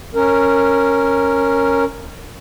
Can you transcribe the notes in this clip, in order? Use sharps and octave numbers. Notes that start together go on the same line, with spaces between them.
C#4 A#4